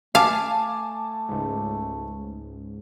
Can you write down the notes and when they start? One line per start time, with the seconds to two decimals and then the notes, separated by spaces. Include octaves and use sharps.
0.15 A3 F5 G#5 A5 D6
1.29 C#2 G#2